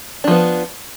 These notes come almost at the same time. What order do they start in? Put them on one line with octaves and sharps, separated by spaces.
D4 F3 B3